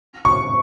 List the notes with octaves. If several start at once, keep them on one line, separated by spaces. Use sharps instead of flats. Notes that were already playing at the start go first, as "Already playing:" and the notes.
C#6